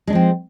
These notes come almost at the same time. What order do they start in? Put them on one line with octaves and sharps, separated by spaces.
G#3 D4 F3 C4